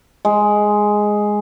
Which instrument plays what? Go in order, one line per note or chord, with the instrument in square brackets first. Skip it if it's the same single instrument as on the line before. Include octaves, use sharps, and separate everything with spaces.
[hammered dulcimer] G#3